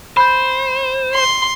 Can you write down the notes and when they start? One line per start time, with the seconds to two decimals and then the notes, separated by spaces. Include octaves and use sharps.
0.17 C5 B5 G6
1.15 C6